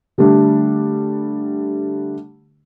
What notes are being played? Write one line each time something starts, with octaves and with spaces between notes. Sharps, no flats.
D3 G3 A3 D4